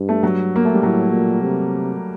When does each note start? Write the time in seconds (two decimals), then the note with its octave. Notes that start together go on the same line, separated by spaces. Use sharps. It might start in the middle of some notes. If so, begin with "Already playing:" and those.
Already playing: G2
0.09 A3
0.23 F#3
0.56 A#3
0.65 A3
0.74 G3
0.83 A2 F#3
1.12 A#2
1.42 C3